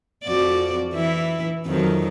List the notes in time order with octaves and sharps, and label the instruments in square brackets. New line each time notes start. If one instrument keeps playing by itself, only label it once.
[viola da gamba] F2 F#4 D5
E3 E4
F2 D#3 F#3